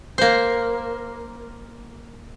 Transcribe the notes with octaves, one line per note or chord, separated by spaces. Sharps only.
A#3 C5